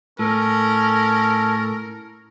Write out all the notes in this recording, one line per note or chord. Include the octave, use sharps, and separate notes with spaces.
A2 C#4 A4 A#4